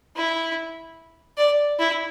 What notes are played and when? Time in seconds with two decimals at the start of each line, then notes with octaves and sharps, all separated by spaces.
0.16 E4
1.37 D5
1.79 E4